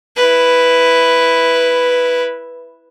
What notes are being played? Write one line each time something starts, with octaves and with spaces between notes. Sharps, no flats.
E4 B4